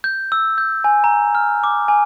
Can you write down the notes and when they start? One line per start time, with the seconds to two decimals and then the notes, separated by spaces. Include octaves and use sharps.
0.04 G6
0.32 E6
0.58 G6
0.84 G#5
1.04 A#5
1.35 F6
1.64 D6
1.88 G#5